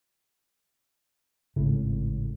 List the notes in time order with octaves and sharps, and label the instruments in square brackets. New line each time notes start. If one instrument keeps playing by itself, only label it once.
[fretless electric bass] G#1 C#3 [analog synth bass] A2